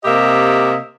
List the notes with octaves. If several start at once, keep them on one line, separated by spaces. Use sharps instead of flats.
C3 A#3 G4 D#5 E5